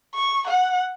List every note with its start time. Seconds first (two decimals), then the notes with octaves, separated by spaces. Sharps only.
0.14 C#6
0.47 F#5